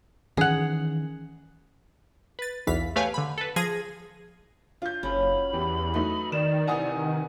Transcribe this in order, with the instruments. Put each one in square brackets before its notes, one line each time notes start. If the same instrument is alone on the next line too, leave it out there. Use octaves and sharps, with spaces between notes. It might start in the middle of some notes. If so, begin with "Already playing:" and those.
[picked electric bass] D#3 E3 C#4 [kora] G#4 F#5
[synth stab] B4 A6
B1 E2 E3 F5 B6
A3 G4 B4 C#5 F5 G#5
D3 B5
A4 B4
F3 G#4 G#6 A#6 D#7
[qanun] D4 [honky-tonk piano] F4 G6
[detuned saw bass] F#1 [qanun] F#3 C#4 [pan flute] B5
[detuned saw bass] E2 [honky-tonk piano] G4
[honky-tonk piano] F#3 A3 D#4 [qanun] B4
[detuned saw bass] D#3 [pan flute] D5 [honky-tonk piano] E7
[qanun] C3 E3 A#5 [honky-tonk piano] F#5 G#5 D#6